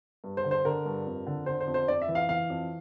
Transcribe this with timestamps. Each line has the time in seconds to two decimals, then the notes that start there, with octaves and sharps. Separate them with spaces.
0.24 G2
0.37 C5
0.44 D3
0.51 C5
0.65 D3 A#4
0.86 G2
1.06 F2
1.26 D3
1.46 D3 C5
1.60 C5
1.67 F2
1.74 C5
1.88 F2 D5
2.02 E5
2.08 E3
2.15 F5
2.29 E3 F5
2.50 F2